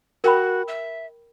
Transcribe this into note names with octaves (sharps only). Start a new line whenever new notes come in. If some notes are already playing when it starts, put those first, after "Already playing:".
F#4 A#4 G5 B5
E5